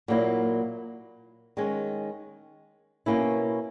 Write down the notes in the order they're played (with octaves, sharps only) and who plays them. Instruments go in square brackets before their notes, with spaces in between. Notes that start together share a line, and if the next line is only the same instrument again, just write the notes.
[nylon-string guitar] A#2 F#3 A#3 E4
D#3 G#3 C#4
B2 A#3 C#4 E4